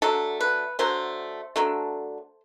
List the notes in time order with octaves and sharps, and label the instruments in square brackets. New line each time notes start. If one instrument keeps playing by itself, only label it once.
[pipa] D3 F#3 A3 A4
B4
D3 F#3 A3 C5
D3 F#3 A3